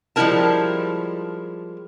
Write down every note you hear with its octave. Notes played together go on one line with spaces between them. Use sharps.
F3 G3 G#3 E4 A#4 A5